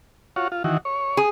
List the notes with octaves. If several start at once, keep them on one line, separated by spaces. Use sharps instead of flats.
F4 F#4 C#5
F4
D#3 E3 F#4
C#5
G#4